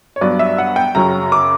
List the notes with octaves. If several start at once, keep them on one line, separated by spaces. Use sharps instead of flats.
C#5
G2 F#3 B3 D5
E5
F#5
G5
F#2 C#3 F#3 C#4 A#5
D6